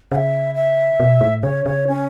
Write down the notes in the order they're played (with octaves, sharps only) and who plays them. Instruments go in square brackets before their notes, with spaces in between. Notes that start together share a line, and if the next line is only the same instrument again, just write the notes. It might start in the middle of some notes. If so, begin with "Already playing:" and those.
[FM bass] C#3 [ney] F#5
[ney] E5
E5
[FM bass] B2
A2
[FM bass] C#3 [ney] C#5
[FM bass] C#3 [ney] C#5
[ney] C#4